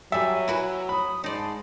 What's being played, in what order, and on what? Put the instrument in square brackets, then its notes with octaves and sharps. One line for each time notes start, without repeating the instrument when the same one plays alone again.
[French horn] F#3 [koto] G3 A4 [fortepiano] E5 [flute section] G#5
[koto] E4 F#4 B4
[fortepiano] B5 [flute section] D#6
[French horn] G#2 [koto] D#4 D5 [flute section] A5 C6